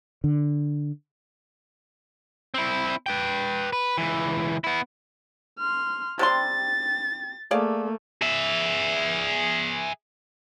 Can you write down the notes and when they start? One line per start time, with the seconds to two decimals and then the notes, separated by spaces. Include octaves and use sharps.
0.24 D3
2.54 C4 E4
3.06 B4 G5
3.73 B4
3.98 C#2 E3
4.64 B3 E4
5.59 C6 F6
6.19 C3 G3 C6 A6
7.51 A3 A#3 G#4 D5 F5
8.22 G#4 E5